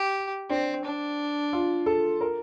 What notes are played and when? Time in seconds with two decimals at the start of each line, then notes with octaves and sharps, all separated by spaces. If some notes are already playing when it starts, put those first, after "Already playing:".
Already playing: G4
0.50 C4 D4
0.84 D4
1.53 F4
1.86 A4
2.21 A#4